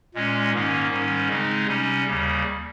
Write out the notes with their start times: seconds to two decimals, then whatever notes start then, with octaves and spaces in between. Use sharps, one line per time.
0.14 A#2 G#3 C#4
0.53 G#2 D#3 A#3 C#4
0.90 G#2 D#3 G3 C#4
1.29 C#3 G#3 C4 D#4
1.66 C3 G3 C#4
2.05 D#2 C#3 G3